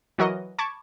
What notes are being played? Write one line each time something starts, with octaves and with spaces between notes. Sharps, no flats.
E3 F#3 F#4 A#4 D#5
A5 B5 C#6 D6 G#6